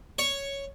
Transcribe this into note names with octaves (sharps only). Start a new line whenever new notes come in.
C#5